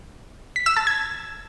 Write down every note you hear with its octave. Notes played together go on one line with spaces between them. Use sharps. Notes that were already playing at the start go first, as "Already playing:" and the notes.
B6
E6
A5
G#6